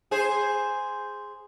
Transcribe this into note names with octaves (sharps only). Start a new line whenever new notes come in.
G#4 C5